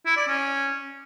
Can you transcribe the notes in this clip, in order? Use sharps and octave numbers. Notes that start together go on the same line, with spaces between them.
E4
D5
C#4